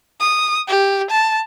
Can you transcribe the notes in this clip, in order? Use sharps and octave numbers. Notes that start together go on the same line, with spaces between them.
D#6
G4
A5